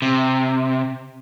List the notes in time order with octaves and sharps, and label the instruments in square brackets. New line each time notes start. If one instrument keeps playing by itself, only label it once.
[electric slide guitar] C3